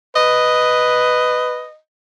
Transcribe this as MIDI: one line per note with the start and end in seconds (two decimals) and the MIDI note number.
0.16 1.68 71
0.16 1.78 75